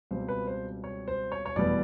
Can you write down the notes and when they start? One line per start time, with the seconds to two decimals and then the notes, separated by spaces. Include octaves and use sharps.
0.11 C#2 B2 G3 C4 C5
0.29 B4
0.47 C5
0.84 C#5
1.08 C5
1.32 C#5
1.46 C#5
1.56 F1 E2 B2 G3 B3 D5